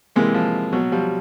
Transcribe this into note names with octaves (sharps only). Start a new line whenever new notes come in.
C3 E3 G#3 A#3
F3
B2 F#3
F3 G3